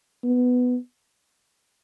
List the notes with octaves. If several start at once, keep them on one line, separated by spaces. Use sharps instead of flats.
B3